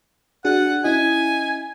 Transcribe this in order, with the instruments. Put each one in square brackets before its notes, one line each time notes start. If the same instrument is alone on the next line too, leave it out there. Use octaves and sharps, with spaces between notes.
[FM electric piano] D4 F#4 G#4 [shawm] F#5
[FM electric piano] C#4 E4 D#5 [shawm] G#5